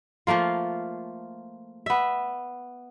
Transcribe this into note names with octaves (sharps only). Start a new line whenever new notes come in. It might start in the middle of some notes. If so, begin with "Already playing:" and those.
F3 A3 A#3 F4
B3 E5